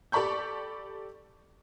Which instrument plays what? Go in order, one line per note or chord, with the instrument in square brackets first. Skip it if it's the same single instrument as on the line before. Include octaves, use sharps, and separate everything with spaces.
[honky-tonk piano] G4 A4 D5 B5 C#6 G6